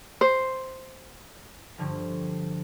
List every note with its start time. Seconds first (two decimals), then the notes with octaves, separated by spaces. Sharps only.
0.21 C5
1.78 G2 D3 F3